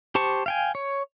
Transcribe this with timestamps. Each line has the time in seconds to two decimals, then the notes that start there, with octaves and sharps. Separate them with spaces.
0.15 G4 C5 A5 C#6
0.46 F5 G5 G#5
0.75 C#5